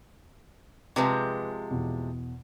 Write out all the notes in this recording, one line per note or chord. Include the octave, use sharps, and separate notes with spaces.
C3 F3 G#3 G4 B4 G#5
E2 B2